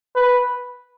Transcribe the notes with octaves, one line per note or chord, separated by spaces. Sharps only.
B4